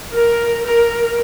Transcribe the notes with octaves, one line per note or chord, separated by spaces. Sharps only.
A#4
A#4